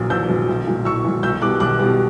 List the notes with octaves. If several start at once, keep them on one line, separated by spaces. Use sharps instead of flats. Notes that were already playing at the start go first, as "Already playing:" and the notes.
Already playing: A#1 A#2 F#3
A#1 E6 G6
A#2 F#3
B1
A#2 F#3
B1 C#6 E6
A#2 F#3
B1 E6 G6
B2 G3 D6 F#6
B1 D6 F#6
B2 G3